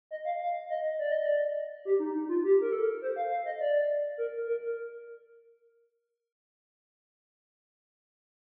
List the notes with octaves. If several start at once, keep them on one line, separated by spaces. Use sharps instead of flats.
D#5
F5
F5
D#5
D5
D#5
D5
G4
D#4
D#4
F4
G4
A#4
A4
C5
F5
F5
D#5
D5
A#4
A#4